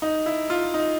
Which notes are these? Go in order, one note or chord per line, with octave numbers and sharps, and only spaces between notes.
D#4
E4
F4
D#4